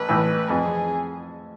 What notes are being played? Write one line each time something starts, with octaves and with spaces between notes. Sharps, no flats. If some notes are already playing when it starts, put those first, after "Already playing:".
Already playing: A1 B4
A2 E3
F2 G#4